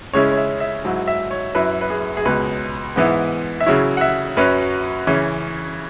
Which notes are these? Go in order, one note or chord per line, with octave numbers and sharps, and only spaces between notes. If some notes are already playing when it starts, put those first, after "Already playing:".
C#3 G#3 C#4 E4 C#5
C#5
E5
E5
G#2 F#3 E4
E5
C#5
F#2 F#3 E4 B4
B4
G#4
G#4
C#2 B2 G#3 B4
G#2 E3 B3 E4
E5
C#3 F#3 E4 C#5
F#5
E5
F#2 F#3 C#4 B4
C#3 E3 C#4